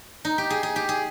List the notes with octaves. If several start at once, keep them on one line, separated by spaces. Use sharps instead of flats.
D#4
G4
G#4
G#4
G4
G#4